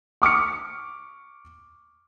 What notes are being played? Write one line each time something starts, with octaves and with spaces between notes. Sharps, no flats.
C#6 D6 F6 C#7